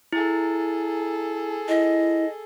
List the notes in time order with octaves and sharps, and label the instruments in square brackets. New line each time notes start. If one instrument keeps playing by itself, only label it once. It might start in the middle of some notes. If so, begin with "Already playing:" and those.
[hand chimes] E4 [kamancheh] G#4 A4
[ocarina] E4 [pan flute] D#5